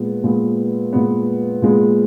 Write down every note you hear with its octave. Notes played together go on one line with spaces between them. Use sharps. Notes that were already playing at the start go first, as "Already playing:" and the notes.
Already playing: A#2 G#3 B3
A#2 G#3 B3
A#2 G#3 B3
A#2 G#3 B3